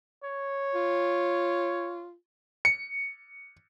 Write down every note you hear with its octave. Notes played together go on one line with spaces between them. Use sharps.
C#5
F4
C#7